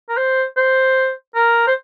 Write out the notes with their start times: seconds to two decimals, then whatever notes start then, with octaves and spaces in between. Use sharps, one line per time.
0.09 A#4
0.17 C5
0.57 C5
1.35 A#4
1.67 C5